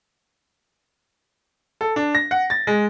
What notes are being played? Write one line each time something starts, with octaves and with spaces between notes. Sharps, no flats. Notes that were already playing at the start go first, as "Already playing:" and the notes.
A4
D4
A#6
F#5
A6
G#3